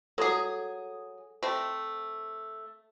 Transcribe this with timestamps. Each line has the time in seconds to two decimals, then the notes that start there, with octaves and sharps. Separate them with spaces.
0.18 F#3 G#4 A4 D6 D#6
1.43 A3 C4